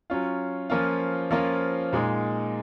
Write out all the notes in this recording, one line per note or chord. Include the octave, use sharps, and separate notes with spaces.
F#3 C#4 F4
F3 A#3 C#4 F4
F3 A#3 C#4 F4
A#2 G#3 D#4